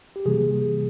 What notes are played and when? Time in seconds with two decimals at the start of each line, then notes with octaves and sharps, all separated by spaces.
0.16 G4
0.25 C3 E3 G3 A#3 G#4